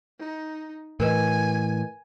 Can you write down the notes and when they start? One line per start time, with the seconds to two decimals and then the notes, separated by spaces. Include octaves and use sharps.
0.20 D#4
1.00 A2 E3 A#4 B4 D#5 G#5